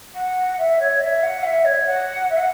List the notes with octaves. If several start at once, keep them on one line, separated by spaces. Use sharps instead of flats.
F#5
E5
C#5
E5
F#5
E5
C#5
F#5
E5
F#5